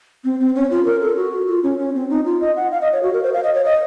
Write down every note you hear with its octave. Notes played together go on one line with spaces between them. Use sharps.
C4
C4
C#4
F4
A#4
A4
F#4
F4
C#4
C#4
C4
D#4
F4
D#5
F#5
F5
D#5
C#5
F#4
A#4
C5
F5
D#5
C#5
D#5